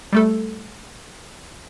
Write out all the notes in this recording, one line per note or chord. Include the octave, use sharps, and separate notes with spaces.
G3 A3 A4